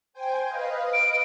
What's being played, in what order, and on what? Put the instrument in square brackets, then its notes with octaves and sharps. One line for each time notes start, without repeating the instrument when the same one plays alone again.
[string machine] C5 G5 G#5
B4 D#5 F5
[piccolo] D7